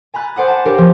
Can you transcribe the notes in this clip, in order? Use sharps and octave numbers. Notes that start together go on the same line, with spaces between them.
G#5 A#5 B5 F#6 A6
C5 D5 F#5 D#6
F#5 A5
D4 G4 A#4 C#5 F5
F3 B3